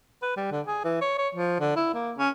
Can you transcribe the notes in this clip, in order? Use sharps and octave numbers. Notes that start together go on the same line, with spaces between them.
B4
G3
D3
G#4
E3
C#5
C#5
F3
D3
E4
A#3
C#4